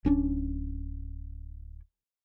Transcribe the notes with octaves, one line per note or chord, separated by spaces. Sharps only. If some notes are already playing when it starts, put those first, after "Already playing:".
D1 C#4 D4